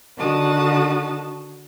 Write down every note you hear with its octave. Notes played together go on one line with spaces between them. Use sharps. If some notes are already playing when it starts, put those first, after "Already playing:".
D3 D#3 F#4 A5 D#6